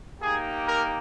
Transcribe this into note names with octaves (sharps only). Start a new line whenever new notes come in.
A#3 D#4 G4 G#4
A#4